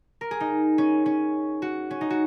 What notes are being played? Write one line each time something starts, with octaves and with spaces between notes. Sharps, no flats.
A#4
G#4
D#4
C#4
C#4
F#4
C#4
D#4
F#4